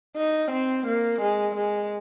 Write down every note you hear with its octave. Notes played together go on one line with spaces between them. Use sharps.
D#4
C4
A#3
G#3
G#3